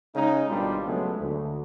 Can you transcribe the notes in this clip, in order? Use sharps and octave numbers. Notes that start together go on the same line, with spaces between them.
C#3 G#3 D#4
G#1 B2 G3 D4 F4
C#2 F#3 G#3 A3 B3
D2